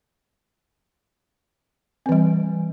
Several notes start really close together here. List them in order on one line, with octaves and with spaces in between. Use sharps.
C4 E3 G3